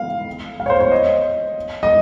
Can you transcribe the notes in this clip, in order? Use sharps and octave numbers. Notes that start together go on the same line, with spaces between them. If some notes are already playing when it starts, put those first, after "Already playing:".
Already playing: F5
F5
C#5
C5
C#5
D#5
D#5